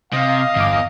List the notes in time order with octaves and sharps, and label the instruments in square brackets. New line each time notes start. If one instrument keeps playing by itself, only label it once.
[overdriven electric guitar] C3 [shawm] D#5 [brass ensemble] F5
[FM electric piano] G1 D6 [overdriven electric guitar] E2